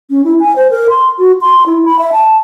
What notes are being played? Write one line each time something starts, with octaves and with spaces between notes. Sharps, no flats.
C#4
E4
G#5
C5
A#4
C6
F#4
C6
E4
B5
E5
A5